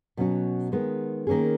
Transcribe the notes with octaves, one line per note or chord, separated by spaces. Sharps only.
B2 F#3 C#4 F#4
D#3 G#3 B3
D#3 A#3 C#4 G#4